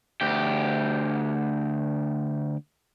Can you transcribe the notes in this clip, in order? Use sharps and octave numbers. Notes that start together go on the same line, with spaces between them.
D2 G4